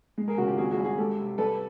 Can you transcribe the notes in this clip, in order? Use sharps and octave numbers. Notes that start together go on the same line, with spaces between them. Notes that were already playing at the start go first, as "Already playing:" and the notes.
G#3
G#4 A#4
C#3 F#4 G#4
F4 G4
G#1 F#4 G#4
F#4 G#4
G2
F#4 G#4
G#3 G4 A4
C3
G3 A4 B4